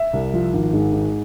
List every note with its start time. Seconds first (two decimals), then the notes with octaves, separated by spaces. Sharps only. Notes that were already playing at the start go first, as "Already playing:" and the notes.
Already playing: E5
0.13 C2
0.34 F3
0.53 G#1
0.73 G#2
0.93 G#2